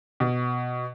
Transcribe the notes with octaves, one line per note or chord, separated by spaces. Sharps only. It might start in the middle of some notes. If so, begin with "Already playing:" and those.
B2